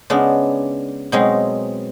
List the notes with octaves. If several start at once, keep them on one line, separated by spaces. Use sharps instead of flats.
C#3 G#3 B3 D4
B2 F#3 G#3 C4 D#4